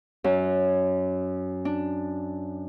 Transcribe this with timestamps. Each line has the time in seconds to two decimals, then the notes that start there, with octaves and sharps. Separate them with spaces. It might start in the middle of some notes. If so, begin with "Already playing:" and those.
0.24 F#2
1.65 D4